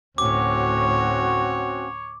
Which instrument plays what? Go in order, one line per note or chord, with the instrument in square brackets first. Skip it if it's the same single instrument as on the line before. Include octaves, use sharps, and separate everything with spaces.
[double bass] D2 A2 [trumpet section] C4 C#4 F#4 [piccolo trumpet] C#5 [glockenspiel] D6